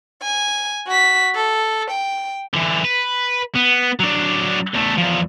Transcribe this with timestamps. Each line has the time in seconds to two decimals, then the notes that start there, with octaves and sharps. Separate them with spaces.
0.22 G#5
0.87 F#4 B6
1.35 A4
1.90 G5
2.54 D3 E3
2.85 B4
3.56 B3
4.00 F#3 D4
4.74 E2 A3
4.98 E2 F3